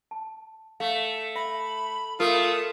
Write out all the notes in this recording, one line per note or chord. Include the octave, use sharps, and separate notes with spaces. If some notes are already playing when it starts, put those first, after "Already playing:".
A5
A3 F5
E5 B5
A3 F4 A#4 D#6